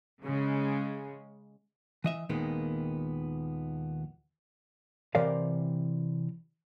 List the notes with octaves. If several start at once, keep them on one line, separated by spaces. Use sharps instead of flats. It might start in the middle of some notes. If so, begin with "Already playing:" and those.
C#3 G#3
E3 D#5 E5
D#2 A#2 D#3 G#3 A#3 B3
C3 E3 A#4 C5 D5 F5